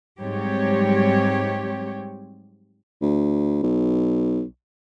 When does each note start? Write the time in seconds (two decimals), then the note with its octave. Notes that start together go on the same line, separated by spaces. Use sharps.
0.21 G#2 F#3 G3 C4 G4 C#5
3.02 D2
3.63 B1